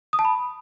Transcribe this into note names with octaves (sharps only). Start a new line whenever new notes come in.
D#6
A5
B5